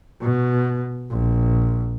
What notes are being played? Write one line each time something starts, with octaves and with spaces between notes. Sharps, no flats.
B2
A#1